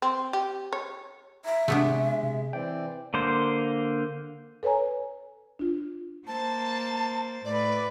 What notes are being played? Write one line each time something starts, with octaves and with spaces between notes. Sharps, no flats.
C4
G4
C#5
E5 A#5
C3 G#3 A3 B3 D4
C3
E3 C4 D5 G5
D3 A#3 C5
A4 B4 C#5 G#5 A#5
D4 F4
A#3 C5 A5 A6
A2 B4 D5